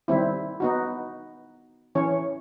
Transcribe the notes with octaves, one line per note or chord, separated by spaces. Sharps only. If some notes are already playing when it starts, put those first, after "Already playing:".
D#3 G3 C4 E4
B3 D#4 F#4
E3 C#4 C#5